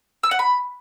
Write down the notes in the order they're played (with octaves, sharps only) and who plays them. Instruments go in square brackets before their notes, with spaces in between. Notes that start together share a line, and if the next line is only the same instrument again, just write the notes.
[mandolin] E6
F#5
B5